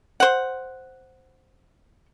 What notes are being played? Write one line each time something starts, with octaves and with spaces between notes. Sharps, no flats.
C5 F#5